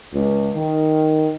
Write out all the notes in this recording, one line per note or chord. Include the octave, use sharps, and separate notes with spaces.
C#2
D#3